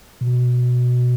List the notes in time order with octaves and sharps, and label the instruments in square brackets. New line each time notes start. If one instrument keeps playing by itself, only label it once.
[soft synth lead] B2